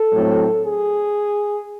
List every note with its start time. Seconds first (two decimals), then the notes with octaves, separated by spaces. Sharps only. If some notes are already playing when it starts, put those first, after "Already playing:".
Already playing: A4
0.12 A2 F#3 A3 C4
0.61 G#4